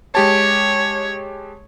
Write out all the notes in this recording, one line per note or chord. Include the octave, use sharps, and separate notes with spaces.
G#3 G4 C#5 A5